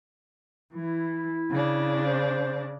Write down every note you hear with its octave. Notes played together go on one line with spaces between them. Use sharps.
E3 E4
C#3 D4
C5